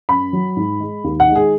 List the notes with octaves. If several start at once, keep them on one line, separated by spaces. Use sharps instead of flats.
F#2 B5
F#3
G#2
G#3
D#2
F#5
D#3 G#3
G#4